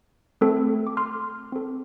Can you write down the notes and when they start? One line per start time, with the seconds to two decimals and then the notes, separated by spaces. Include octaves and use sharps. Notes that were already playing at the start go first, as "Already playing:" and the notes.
0.41 A3 C4 A4
0.87 D6
0.97 C6 F6
1.52 C4 A4